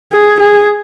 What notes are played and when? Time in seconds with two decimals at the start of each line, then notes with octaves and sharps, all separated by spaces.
0.12 G#4
0.40 G#4